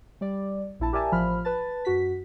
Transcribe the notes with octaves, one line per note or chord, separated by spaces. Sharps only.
G3 D5
A#1 E4 A5
G4 A#4 D5 E5 G#5 A5
A1 F3 B5 F6
B4 A5 A6
F#2 F#4 B6